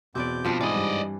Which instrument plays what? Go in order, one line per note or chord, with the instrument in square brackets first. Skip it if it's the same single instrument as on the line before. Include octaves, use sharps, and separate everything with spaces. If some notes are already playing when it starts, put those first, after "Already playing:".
[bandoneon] E2 D6 G6 [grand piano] B2 [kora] C4 B4 D5
[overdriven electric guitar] F2 [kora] F3 G3 D4
[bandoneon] G#2 [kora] E3 [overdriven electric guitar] D5 D#5
[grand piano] G2